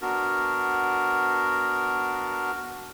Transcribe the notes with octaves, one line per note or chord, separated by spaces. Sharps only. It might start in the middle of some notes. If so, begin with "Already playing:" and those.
B3 D4 F#4 A#4